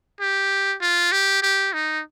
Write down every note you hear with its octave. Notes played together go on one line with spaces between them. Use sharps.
G4
F4
G4
G4
D#4